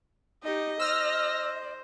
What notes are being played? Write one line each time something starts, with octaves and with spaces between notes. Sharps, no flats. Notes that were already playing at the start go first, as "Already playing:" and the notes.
D#4 G4 D#5
C5 E6 F6 A#6